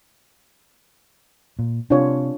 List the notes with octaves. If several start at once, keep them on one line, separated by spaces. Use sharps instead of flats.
A#2
C3 D4 F4 C#5